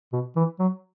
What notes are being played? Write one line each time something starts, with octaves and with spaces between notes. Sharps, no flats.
B2
E3
F#3